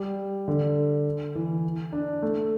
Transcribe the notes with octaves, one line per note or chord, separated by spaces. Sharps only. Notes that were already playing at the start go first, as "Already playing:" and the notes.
Already playing: G3
D3
E3
D4
A3